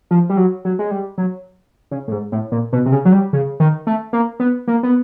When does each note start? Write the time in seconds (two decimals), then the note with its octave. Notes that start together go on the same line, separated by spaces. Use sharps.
0.11 F3
0.30 G3
0.37 F#3
0.65 F#3
0.79 G#3
0.91 G3
1.18 F#3
1.91 C#3
2.08 A2
2.12 G#2
2.32 A2
2.52 A#2
2.73 B2
2.86 C3
2.92 C#3
3.05 F#3
3.12 G3
3.33 C#3
3.60 D#3
3.87 A3
4.13 A#3
4.40 B3
4.68 A#3
4.83 B3